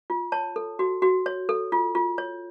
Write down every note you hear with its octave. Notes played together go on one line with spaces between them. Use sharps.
F4
C#5 A5
A4
F#4
F#4
C#5
A4
F4
F4
C#5